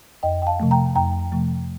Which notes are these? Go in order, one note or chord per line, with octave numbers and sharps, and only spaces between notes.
F2 D#5 G5
G5
F5 A5
C3 F3 A3
G5 A#5
F2 G5 A#5
C3 F3 A3